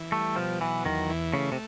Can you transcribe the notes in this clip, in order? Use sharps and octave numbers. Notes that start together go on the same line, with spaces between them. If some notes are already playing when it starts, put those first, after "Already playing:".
Already playing: E3
G3 A3
B2 F3
E3 F#3
E2 D#3
E3
C#3 A3
C3